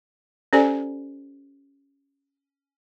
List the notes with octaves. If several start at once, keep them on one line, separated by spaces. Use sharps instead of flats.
C#4 G4 A4 C5 D5 G#5